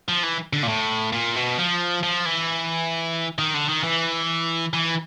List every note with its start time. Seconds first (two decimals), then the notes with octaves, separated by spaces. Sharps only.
0.08 F3
0.23 E3
0.53 D3
0.63 A#2
0.68 A2
1.13 A#2
1.36 B2
1.58 F3
2.03 F3
2.26 E3
3.38 D#3
3.54 D3
3.69 D#3
3.83 E3
4.74 E3